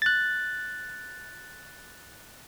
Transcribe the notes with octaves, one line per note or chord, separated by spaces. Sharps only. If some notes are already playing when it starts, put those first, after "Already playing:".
F#6 A6